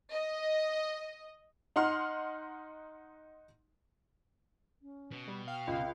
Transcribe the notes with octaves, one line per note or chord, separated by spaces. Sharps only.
D#5
D#4 F#5 C6 F6
C#4
B2
G3
F5 G5
C#2